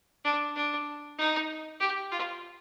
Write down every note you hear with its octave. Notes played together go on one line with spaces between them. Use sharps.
D4
D4
D#4
G4
F4